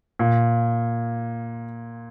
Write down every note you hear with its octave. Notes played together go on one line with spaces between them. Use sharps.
A#2